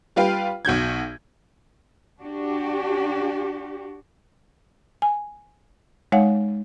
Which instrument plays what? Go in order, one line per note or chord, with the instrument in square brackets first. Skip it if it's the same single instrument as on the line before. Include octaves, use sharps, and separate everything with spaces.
[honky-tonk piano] G3 F4 B4 F5 G5
B1 F#4 G6 G#6
[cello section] D4 F#4 G4
[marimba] G#5
G#3 D#4 C#5 F5 F#5